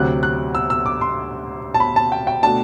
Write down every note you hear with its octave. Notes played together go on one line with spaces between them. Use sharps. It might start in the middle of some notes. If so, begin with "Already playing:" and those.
Already playing: D2 C3 F#3 F#6
F#6
E6
E6
D6
C6
A5
B5
A5
G5
G5
B2 A3 D4 A5